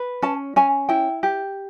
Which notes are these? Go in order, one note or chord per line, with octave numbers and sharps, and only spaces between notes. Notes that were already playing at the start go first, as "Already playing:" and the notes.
Already playing: B4
C#4 A5
C#4 G#5
E4 G5
G4